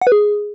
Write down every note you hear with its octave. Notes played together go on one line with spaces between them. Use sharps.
F#5
B4
G#4